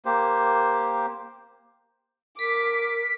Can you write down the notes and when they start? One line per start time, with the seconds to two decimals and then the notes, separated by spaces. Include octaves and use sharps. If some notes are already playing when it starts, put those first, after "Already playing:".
0.05 A#3 G4 C5
2.39 A#4 D6 B6